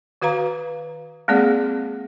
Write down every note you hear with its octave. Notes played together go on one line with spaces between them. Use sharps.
D#3 F#4 B4 F5 A#5
G#3 A#3 C4 G#4 D5 F#5